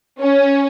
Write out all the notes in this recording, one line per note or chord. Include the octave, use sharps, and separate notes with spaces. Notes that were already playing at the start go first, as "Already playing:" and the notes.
C#4